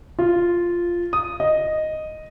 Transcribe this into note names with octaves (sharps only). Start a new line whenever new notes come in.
F4
D#6
D#5